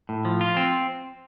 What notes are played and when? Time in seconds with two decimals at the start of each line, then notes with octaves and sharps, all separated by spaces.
0.09 A2
0.25 F3
0.41 F4
0.57 C4